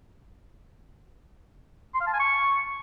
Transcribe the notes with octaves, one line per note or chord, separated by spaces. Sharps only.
C6
F5
A5
G#5
C#6